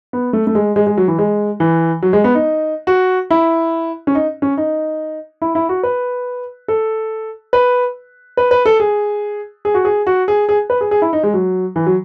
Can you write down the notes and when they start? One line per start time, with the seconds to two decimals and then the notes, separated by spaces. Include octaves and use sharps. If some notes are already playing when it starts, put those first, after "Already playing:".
0.13 B3
0.33 A3
0.47 A3
0.55 G#3
0.76 G#3
0.87 G#3
0.97 F#3
1.08 E3
1.18 G#3
1.60 E3
2.02 F#3
2.13 G#3
2.24 B3
2.35 D#4
2.87 F#4
3.31 E4
4.07 C#4
4.15 D#4
4.42 C#4
4.57 D#4
5.42 E4
5.55 E4
5.69 F#4
5.83 B4
6.68 A4
7.53 B4
8.37 B4
8.51 B4
8.66 A4
8.80 G#4
9.65 G#4
9.74 F#4
9.85 G#4
10.07 F#4
10.28 G#4
10.49 G#4
10.70 B4
10.81 G#4
10.91 G#4
11.02 E4
11.13 D#4
11.23 G#3
11.34 F#3
11.76 E3
11.86 F#3